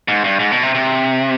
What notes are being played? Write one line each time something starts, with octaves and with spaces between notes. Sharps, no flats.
G#2
G2
G#2
B2
C3
C3